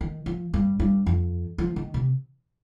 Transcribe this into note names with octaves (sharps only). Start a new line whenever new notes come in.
D#3
F3
G2
G2
F2
F3
D#3
C3